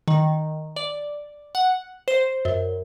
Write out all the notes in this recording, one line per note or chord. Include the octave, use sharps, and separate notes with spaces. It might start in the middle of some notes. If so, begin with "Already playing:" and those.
D#3
D5
F#5
C5
F#2